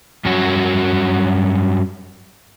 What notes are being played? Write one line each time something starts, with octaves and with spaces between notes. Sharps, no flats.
G2 F#3 C#4 F#4